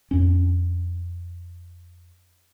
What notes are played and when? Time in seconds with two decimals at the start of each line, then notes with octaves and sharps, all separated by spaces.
0.11 F2 C#4